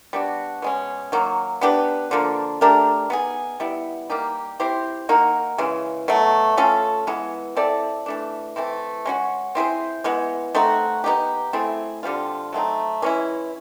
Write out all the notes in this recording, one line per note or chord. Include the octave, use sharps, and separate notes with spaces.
G3 B3 D4 F#4
B2 G#3 C#4
D#3 F#3 A#3
B3 D4 G4 B4
D3 F3 A#3
A3 D4 G4 A#4
B3 D#4 G#4
G3 B3 E4
G3 A#3 D#4 G4
C4 E4 G4 C5
A#3 D#4 F#4 A#4
C#3 E3 G#3
B2 F#3 A3
A3 C#4 F4 A4
E3 G#3 B3
C4 E4 A4 D5
E3 A3 D4
E3 A3 C4 E4
G#3 C#4 F#4
C4 E4 G#4 C5
E3 G#3 B3
A3 C4 D#4 F#4
B3 D#4 G4
A3 C4 E4 G#4
D3 G3 C4 F4
F#3 A3 C4 D#4
E3 G#3 C#4 E4